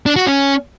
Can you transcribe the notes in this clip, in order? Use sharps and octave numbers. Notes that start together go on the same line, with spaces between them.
D4
F#4
C#4